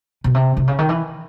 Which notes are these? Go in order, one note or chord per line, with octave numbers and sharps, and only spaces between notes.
B2
C3
C3
C#3
D#3
E3